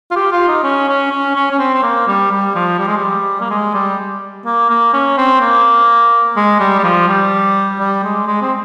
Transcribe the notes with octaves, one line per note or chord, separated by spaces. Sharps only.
F4
G4
F4
D#4
C#4
C#4
C#4
C#4
C#4
C4
C4
A#3
G3
G3
F3
G3
G#3
G3
A#3
G#3
G3
A#3
A#3
C#4
C4
A#3
G#3
G3
G3
F3
G3
G3
G#3
G#3
C4